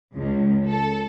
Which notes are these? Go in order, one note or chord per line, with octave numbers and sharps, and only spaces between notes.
C#2
A4